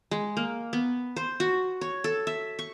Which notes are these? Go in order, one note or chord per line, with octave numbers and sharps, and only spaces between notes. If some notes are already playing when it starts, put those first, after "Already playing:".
G#3
A#3
B3
C5
F#4
C#5
A4
E5
C#6